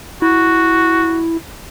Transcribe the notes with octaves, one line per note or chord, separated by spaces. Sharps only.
E4 F#4